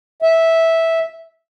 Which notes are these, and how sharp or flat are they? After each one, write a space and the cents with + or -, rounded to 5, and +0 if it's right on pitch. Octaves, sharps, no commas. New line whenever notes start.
E5 -10